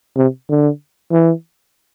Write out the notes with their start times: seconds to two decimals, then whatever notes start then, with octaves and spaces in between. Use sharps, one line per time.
0.17 C3
0.50 D3
1.12 E3